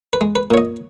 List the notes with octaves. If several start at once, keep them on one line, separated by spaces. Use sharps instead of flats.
B4
G#3
B4
A#2 C#5
D#5